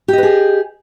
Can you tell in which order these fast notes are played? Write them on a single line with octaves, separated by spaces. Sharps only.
G4 D#5 B4 G#4